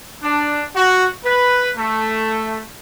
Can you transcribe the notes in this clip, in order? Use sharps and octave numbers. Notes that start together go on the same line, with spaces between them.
D4
F#4
B4
A3